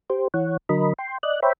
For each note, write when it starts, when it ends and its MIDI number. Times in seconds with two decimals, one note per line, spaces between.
0.10 0.28 67
0.10 0.28 72
0.34 0.57 52
0.34 0.57 73
0.34 0.57 78
0.69 0.93 50
0.69 0.93 54
0.69 0.93 70
0.69 0.93 75
0.69 0.93 83
0.98 1.18 79
0.98 1.18 84
1.23 1.40 74
1.23 1.40 75
1.23 1.40 90
1.43 1.53 72
1.43 1.53 73
1.43 1.53 76
1.43 1.53 79
1.43 1.53 83